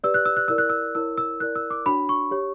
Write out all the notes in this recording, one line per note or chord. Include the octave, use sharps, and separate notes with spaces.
G4 B4 D5 E6
F#6
E6
F#6
E4 A#4 D5 E6
F#6
E6
E4 A#4 C#5 E6
E6
E4 A#4 D5 F#6
E6
D6
D4 F#4 C#5 B5
C#6
G4 C#5